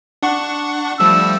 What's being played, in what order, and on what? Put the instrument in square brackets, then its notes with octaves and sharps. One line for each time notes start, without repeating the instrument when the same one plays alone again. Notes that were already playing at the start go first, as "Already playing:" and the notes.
[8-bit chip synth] D4 F#5 C#6
[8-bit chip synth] F3 G3 A3 [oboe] E6